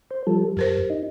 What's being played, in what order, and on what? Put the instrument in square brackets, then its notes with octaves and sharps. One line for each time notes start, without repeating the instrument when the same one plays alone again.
[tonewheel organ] C5
F3 G3 A4
[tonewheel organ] F#2 [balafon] G4 A#4 C5
[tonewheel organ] D#4